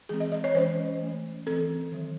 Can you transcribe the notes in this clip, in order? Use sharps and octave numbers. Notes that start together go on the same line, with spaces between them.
E3 G#3 C4 G#4
D#5
D#5
C#5
E3 G#3 C#4 C5
E3 A3 C#4
E3 C4 A4
D#3 F#3 C4